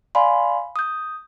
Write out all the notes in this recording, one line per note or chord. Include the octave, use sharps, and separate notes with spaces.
D5 F5 G#5 B5 C6
D#6 G6